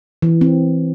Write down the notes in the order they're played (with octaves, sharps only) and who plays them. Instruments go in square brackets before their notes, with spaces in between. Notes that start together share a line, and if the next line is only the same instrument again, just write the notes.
[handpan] E3
C4